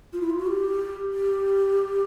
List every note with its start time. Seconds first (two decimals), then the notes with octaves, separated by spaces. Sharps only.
0.13 F4
0.21 E4
0.30 F4
0.38 F#4
0.47 G4
1.13 G4